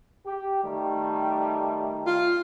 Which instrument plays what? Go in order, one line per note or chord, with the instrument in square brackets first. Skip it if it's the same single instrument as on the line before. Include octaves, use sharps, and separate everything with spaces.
[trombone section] G4
D#3 G3 A3
[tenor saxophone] F4